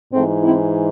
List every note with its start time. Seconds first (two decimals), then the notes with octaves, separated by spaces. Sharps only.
0.13 G#2 E3 A3 C4
0.43 C4 E4